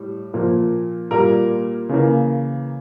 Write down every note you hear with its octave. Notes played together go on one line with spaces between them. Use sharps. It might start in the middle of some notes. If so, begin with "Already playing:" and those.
Already playing: A2 G3
A#2 F3 A#3
A#2 G3 A#3 A#4
C#3 E3 A#3